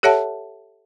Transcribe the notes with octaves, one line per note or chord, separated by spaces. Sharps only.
G4 A4 C#5 E5 F#5 A5